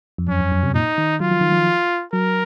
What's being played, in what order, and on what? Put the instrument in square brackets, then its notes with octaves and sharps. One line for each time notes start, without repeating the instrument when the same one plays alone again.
[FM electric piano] F2
[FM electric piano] F#2 [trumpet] C#4
[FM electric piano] F#2
F#2
C3
[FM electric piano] A#2 [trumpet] D#4
[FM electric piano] D#3
[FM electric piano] F#3 [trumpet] F4
[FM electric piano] F3
D#3
F3
[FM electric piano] F#3 [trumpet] A#4